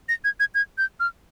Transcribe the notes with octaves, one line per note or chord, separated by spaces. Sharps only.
A#6
G#6
G#6
G#6
G6
F6